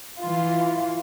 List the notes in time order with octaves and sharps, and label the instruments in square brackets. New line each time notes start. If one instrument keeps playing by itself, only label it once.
[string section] E3 F4